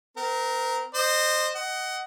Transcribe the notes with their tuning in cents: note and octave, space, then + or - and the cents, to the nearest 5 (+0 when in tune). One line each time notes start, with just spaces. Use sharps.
C4 -35 A#4 +0
C5 +0 D#5 -25
D#5 +0 F#5 +20